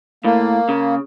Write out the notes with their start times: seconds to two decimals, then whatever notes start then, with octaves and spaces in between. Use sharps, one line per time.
0.24 A2 A#3
0.69 C#3